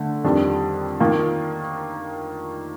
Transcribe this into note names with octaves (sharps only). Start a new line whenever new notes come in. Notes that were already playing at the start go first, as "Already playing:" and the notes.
Already playing: D3 A3
F2 D#3 G3 D4
D#3 A#3 F4